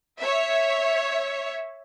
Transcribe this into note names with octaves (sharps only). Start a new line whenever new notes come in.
C#5 E5